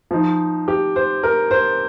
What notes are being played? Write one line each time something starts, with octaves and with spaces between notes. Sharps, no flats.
F3 D#4
G4
C5
A#4
C5